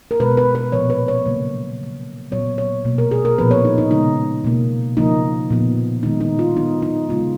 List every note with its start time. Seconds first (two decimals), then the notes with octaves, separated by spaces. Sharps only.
0.11 A#4
0.20 B2 G#3 B3 B4
0.37 B4
0.55 B4
0.72 A#2 F3 B3 C#5
0.90 B4
1.08 C#5
1.26 C#3 F#3 A#3
1.79 C#3 F3 A#3
2.31 A#2 F#3 B3 C#5
2.58 C#5
2.85 B2 A#3
2.98 A#4
3.11 G#4
3.25 A#4
3.38 A#2 F3 B3 B4
3.51 C#5
3.65 D#4
3.78 D#4
3.91 C#3 G#3 B3 D#4
4.44 B2 A#3
4.97 C#3 F3 A#3 D#4
5.50 A#2 F3 B3
6.03 D#3 G#3 B3 D#4
6.21 D#4
6.39 F4
6.56 D#3 F#3 B3 D#4
6.82 D#4
7.09 C#3 G#3 B3 F4